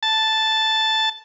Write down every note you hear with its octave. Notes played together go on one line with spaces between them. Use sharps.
A5